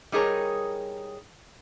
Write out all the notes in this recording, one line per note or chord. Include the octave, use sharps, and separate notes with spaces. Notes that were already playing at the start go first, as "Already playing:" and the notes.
G3 D#4 G#4 A#4 C#5